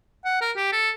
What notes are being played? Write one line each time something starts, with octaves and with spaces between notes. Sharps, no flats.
F#5
A#4
G4
A4